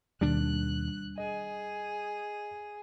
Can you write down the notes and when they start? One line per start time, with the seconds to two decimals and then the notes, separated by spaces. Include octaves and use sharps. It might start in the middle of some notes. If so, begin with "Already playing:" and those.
0.21 D#2 B2 D#3 G3 D4 F#6
1.18 G#4 D#5